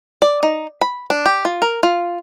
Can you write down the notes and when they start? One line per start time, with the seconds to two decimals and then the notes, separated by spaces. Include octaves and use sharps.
0.22 D5
0.43 D#4
0.81 B5
1.10 D4
1.26 G4
1.45 F4
1.62 A#4
1.83 F4